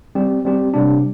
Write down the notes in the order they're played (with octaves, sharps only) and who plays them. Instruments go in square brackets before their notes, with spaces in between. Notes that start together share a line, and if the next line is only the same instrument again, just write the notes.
[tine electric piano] G3 C4 G4
G3 C4 G4
C3 G3 D4